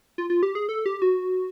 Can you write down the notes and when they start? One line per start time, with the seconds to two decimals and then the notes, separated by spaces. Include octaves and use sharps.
0.18 F4
0.30 F4
0.43 G4
0.55 G#4
0.69 A4
0.86 G4
1.02 F#4